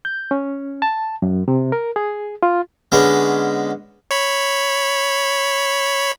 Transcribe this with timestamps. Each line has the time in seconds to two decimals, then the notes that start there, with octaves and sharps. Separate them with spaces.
0.05 G6
0.31 C#4
0.82 A5
1.22 F#2
1.48 C3
1.72 A#4
1.96 G#4
2.43 F4
2.92 D3 G#3 B3 C#4
4.11 C#5 B5